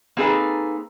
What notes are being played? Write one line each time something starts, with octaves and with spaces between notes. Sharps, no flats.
A#3 C4 D#4 G#4 A4 B4